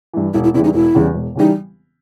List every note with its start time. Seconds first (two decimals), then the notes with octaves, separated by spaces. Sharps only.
0.13 G2 E3
0.34 E1 E4
0.44 E4
0.54 E2 C#3 E3 G3 E4
0.64 D#4
0.74 E1 E4
0.95 E2 C#3 E3 G3
1.14 E1
1.36 C#3 E3 G3 D#4